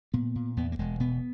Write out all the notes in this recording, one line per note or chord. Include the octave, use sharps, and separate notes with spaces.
A#2 B3
A#2
E2 B3
A#3
E1 G#3
B2 B3